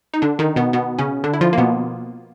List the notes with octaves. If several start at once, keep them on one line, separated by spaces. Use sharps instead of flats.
D#4
D3 D4
D#3 D#4
B2 B3
B2 B3
C#3 C#4
D3 D4
E4
F3 F4
A#3
B2 B3